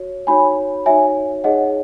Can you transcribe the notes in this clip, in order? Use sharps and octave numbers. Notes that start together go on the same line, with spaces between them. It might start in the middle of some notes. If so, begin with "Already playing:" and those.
Already playing: F#4 C#5
D#4 F#4 C#5 G#5 B5
D#4 F#4 C#5 E5 G#5
D#4 G#4 C#5 D#5 F#5